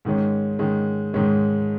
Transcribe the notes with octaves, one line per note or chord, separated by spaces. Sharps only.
G#2 D#3 G#3 C#4
G#2 D#3 G#3 C#4
G#2 D#3 G#3 C#4